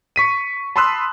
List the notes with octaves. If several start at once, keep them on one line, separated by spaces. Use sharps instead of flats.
C#6 B6 D#7
A5 B5 C6 D#6 E6 F#6